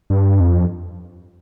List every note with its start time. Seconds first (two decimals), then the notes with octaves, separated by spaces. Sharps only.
0.10 G2
0.40 F2